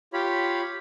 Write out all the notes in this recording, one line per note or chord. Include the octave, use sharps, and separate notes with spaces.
F4 G4 C#5 B5